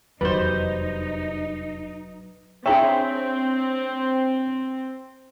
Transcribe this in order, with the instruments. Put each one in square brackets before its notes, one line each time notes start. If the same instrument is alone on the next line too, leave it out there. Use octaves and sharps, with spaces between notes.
[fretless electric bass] F1 E2 [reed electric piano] F#3 B4 [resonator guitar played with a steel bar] G3 C5 [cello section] D#4
[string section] C4 [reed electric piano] D4 C#5 [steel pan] E4 G#4 E5 [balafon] G5 A#5